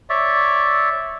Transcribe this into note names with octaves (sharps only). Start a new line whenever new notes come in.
C#5 D5 E5